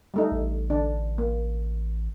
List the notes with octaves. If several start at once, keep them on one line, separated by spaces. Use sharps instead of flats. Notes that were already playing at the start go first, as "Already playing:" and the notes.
G3 A3 D#4
A1
D3 D4
A#3